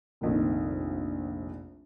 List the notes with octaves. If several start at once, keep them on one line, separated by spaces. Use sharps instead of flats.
F1 A#1 D#3